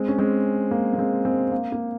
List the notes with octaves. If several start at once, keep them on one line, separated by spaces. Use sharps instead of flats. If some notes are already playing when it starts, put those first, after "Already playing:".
Already playing: G#3 C4
C#4
G#3 C4
A#3
A#3
G#3 C4
G#3 C4
A#3
A#3